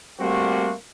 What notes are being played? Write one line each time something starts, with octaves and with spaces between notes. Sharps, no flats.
G3 A3 A#3 C4 F#4